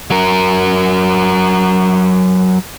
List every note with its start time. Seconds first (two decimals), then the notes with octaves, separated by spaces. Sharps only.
0.10 F#3 A#4